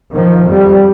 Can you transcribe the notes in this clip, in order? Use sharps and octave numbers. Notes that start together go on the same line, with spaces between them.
D#3 F3
F2 G3